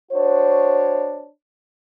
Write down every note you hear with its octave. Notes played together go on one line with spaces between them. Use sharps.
D4 F#4 C5 C#5